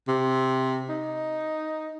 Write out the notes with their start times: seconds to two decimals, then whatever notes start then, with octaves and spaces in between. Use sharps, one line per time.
0.08 C3
0.89 D#4